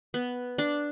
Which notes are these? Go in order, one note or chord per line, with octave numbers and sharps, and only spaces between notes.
B3
D4